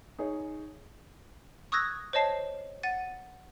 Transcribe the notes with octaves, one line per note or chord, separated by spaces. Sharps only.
D#4 G#4 C#5
C#6 D#6 E6 F#6 G#6 A#6
C5 C#5 D#5 A5 C7
F#5 A6 D#7